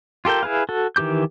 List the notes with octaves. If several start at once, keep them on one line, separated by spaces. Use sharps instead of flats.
F4 G4 A4 A#4 G5
E4 G#4 B4 F5
F#4 A4
D#3 E3 G4 D6 G6